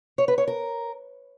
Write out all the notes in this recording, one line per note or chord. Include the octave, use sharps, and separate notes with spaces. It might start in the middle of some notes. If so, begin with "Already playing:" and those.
C#5
B4
C#5
A#4